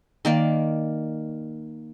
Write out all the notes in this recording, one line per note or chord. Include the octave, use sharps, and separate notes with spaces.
D#3 A#3 D5